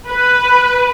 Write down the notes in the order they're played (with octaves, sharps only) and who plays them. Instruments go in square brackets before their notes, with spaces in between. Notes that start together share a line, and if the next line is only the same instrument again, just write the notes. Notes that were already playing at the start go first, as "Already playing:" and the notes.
[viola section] B4